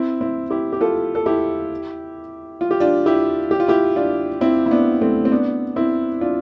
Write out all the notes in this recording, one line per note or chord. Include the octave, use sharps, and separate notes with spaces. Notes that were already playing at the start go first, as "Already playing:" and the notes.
Already playing: C4 E4
C4 E4
E4 G4
G4
F4 A4
A4
E4 G4
F4
G4
D4 F4
E4 G4
G4
F4
E4 G4
D4 F4
C4 E4
E4
B3 D4
A3 C4
C4
B3 D4
C4 E4
D4 F4